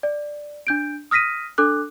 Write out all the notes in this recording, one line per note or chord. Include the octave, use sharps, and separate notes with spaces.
D5
D4 G6 D7
D#6 F6 A#6 B6 D#7
D4 A4 D6 F#6